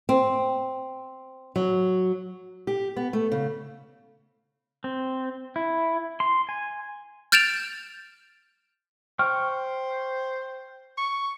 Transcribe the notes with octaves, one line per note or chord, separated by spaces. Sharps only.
C4
F#3
G4
B3
A3
C#3
C4
E4
C6
G#5
F6 G6 A6 D7 E7 F7
C5 G5 C#6 F6
C#6